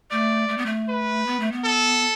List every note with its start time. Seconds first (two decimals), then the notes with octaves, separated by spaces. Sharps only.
0.11 A3 D5
0.49 A3
0.58 B3
0.66 A3
0.88 B4
1.26 B3
1.40 A3
1.52 B3
1.64 A4